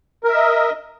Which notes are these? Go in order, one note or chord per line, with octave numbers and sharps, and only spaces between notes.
A#4 D#5 E5